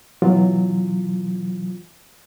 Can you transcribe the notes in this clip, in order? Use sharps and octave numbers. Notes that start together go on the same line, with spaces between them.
B2 E3 F#3 F4